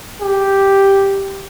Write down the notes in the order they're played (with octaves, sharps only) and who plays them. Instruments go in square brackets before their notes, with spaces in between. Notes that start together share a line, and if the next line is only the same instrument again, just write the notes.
[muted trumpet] G4